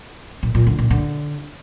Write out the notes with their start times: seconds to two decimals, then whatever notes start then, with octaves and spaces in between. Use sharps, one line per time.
0.43 A#2
0.55 A#2
0.67 D3
0.79 A#2
0.90 D3